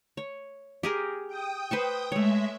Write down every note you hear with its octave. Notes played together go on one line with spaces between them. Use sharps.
C#5
G4 G#4 A#4
G5 D#6
B4 C5 C#6
G#3 A3 C#5 E5